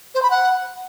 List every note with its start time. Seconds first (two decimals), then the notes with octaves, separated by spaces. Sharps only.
0.15 C5
0.23 B5
0.30 F#5